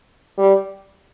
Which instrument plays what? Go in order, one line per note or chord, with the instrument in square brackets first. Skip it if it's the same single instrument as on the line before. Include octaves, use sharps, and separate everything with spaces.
[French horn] G3